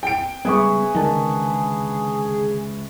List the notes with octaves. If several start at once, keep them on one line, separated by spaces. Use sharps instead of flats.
G5 D7
C#2 G3 B3 G#4 B4 E5 C#6
C#2 D3 D#3 A5